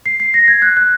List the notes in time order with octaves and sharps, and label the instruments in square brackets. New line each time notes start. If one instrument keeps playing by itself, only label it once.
[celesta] C7
C7
A#6
G#6
F#6
F#6